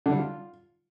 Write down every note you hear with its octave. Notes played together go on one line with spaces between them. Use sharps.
D3
G3
F4